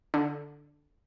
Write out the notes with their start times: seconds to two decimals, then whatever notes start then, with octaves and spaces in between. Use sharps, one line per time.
0.14 D3